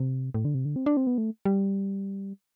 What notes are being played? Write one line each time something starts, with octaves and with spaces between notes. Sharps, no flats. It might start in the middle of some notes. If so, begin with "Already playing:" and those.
Already playing: C3
A2
D3
C3
D3
C4
D4
C4
B3
A3
G3